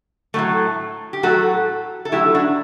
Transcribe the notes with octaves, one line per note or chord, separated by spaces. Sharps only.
A2 F#3 A3
G4
A2 F#3 A3 F#4 A4
A4
A2 F#3 A3 E4 G4
D4 F#4